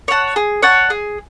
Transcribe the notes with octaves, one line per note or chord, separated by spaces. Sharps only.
C#5 F#5 A5
G#4
C#5 F#5 A5
G#4